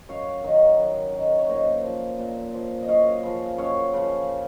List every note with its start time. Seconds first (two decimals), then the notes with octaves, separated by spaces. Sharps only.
0.09 F#2 C#5 F5
0.44 D#3 F#3
0.79 F#2
1.14 D#3 F#3
1.38 C#5
1.49 A#2 C5 D#5
1.84 F3
2.19 A#2
2.54 F3
2.82 D#5
2.88 F#2 C#5 F5
3.23 C#3 F3
3.58 F#2 C#5 F5
3.93 C#3 F3